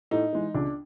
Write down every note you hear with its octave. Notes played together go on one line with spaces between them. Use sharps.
A2 D#4
E3 G#3
C#2 D4